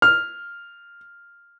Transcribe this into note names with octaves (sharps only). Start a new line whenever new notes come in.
F6